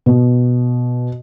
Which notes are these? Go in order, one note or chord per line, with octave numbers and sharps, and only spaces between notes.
B2